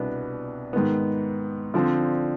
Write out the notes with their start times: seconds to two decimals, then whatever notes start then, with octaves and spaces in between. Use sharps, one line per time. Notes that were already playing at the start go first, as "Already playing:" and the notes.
Already playing: C2 B2 B3 D4
0.73 G#2 D#3 B3
1.74 D3 F3 C4